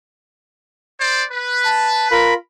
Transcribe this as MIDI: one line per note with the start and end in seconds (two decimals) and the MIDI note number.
0.99 1.23 72
0.99 1.23 74
1.31 2.25 71
1.65 2.09 81
2.11 2.37 65
2.11 2.34 70
2.11 2.34 83